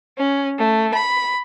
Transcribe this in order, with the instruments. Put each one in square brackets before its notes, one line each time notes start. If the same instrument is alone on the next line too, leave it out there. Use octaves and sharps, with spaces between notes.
[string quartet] C#4
A3
B5